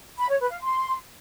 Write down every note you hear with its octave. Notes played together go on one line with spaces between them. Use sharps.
B5
C#5
B4
F5
C6